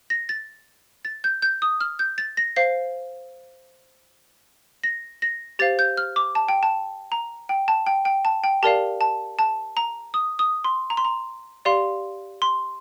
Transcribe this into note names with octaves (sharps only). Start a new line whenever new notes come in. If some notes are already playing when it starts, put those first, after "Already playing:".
A#6
A6
A6
G6
G6
D#6
F6
G6
A6
A#6
C5 F5 C7
A#6
A#6
G4 C5 F5 A6
G6
F6
D6
A5
G5
A5
A#5
G5
A5
G5
G5
A5
G5
G4 A#4 D5 F5 A5
A5
A5
A#5
D#6
D#6
C6
A#5
C6
A#5
G4 D5 F5 C6
C6